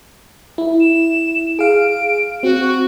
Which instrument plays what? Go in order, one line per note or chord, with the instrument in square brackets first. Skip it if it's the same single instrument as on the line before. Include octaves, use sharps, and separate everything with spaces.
[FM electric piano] E4
[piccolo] E7
[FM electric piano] G#4 F5 [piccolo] D7
[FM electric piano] C4 [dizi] F#4
[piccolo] C#6